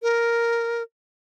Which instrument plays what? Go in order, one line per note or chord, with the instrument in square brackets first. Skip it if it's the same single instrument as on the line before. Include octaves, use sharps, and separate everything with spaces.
[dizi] A#4